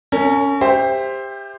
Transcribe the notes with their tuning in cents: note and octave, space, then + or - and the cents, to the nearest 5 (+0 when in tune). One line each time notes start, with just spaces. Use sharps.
C#4 +10 A#4 -40
G4 +25 C5 +0 E5 +0